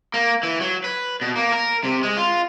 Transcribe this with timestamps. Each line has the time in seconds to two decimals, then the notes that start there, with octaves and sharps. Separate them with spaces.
0.14 A#3
0.43 E3
0.61 F#3
0.84 B4
1.21 B2
1.36 A#3
1.52 A#4
1.84 C3
2.03 G#3
2.17 F4